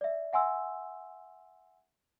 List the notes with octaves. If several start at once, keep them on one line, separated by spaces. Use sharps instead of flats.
D5 E5
E5 F#5 G#5 C6 E6